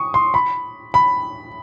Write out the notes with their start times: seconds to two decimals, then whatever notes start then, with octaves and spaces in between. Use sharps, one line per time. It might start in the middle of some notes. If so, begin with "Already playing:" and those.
Already playing: C#6 D#6
0.14 C6
0.34 B5
0.94 B5